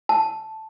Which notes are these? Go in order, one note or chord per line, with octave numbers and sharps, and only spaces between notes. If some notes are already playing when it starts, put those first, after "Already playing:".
A5